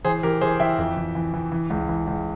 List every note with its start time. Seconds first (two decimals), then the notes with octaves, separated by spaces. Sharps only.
0.05 E3 G#4 C5
0.23 E3 G4 A#4
0.41 E3 G#4 C5
0.60 E3 E5 G5
0.78 F2
0.97 E3
1.15 E3
1.34 E3
1.52 E3
1.70 C#2
1.89 E3
2.07 C#2